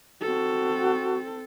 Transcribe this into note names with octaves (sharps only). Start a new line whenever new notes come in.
C4 F#4 A4